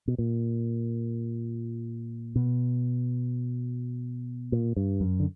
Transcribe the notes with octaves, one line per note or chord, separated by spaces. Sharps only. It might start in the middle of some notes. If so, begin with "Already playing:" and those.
B2
A#2
B2
A#2
G2
F#2
D3